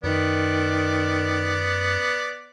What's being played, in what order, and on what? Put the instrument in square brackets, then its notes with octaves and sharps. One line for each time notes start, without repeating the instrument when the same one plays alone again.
[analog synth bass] F#2 [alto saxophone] D#3 [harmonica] B3 D5